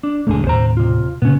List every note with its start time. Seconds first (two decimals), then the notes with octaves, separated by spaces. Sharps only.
0.03 D4
0.27 D#1 C#2 G#2 D3 A3 G#4
0.47 D#2 A2 C5 A#5
0.77 C3 F4
1.22 A#2 C#3 B3 C#4